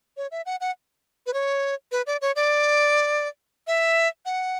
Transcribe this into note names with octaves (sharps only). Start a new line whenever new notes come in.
C#5
E5
F#5
F#5
B4
C#5
B4
D5
C#5
D5
E5
F#5